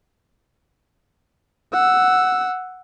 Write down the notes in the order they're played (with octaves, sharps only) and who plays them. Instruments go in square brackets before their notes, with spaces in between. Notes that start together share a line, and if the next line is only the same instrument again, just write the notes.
[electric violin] F#5 E6